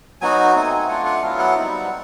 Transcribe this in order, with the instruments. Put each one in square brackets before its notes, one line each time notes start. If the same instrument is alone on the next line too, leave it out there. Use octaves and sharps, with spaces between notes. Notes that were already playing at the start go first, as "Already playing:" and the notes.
[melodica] F#3 B3 D#4 F#4 G#5
A3 C4 D#4
A3 D4 F4 F#5
F#5
F#3 B3 E4 F5
F#5
G3 C4 D#4